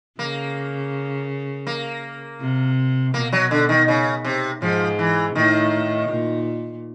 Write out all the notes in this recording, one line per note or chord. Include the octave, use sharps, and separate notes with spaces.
C#3 A#3
A#3
C3
B2 A#3
F#3
D3
D#3
C#3
C3
G#2 F3
E3
A2 D#3
A#2